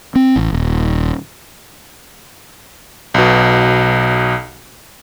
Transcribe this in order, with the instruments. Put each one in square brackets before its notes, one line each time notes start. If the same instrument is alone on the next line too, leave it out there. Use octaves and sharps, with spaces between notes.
[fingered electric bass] C4
A1
D#1
[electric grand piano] B1 B2